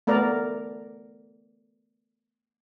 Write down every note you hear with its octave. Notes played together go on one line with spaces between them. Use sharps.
A3 B3 A#4 D5 A#5